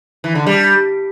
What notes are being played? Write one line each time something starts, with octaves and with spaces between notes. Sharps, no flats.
E3
D3
G3